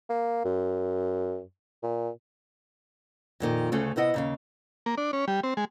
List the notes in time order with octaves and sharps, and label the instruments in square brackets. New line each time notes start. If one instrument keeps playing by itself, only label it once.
[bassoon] A#3
F#2
A#2
[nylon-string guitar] F2 A#2 D#3
D2 C#3 A3 C#4
C3 B3 E4 D#5 F#5
D#2 C#3 F5
[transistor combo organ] A#3
D4
C#4
G3
C4
G#3